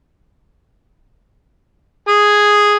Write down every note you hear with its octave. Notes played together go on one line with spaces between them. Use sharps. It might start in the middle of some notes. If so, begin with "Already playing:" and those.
G#4